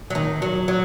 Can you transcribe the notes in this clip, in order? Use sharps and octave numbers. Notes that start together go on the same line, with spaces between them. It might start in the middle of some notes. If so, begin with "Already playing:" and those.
F#3
D#3
F#3
F#3